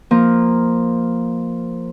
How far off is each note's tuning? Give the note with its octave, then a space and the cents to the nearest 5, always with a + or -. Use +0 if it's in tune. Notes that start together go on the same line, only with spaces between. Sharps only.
F3 +0 A#3 +0